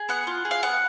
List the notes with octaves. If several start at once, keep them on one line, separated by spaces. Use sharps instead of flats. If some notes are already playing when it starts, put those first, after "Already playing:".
Already playing: G#4
B3 F#5
F4
G#4
F5
B3 F#5